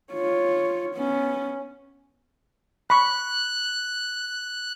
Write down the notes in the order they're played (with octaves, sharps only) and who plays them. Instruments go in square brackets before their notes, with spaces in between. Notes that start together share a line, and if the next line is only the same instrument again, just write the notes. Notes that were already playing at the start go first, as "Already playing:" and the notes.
[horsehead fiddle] F4 C#5
B3 C#4
[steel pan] B5 C#6 [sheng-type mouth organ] F#6